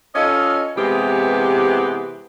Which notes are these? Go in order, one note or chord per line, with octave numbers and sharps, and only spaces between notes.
C#4 F4 A4 D#5
C3 E3 G#3 B3 G4 B4